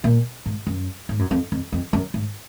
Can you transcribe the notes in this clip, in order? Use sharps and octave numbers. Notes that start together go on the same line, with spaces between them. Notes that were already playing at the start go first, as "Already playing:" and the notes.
A#2
G#2
F#2
G#2
F#2
F2
F2
F2
F#2
G#2